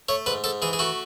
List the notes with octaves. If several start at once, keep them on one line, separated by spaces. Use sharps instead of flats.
A3 C#5
G#2 B4
G#2 A4
E3 G#4
G#4
A3 F#4